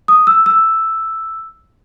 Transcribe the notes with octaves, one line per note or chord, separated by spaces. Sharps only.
D#6
E6
E6